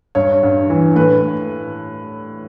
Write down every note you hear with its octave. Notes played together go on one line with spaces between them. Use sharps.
G2 C#5
G2
E3
A2 B4